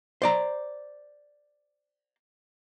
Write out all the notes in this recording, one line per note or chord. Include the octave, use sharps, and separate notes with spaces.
C5 D5 A#5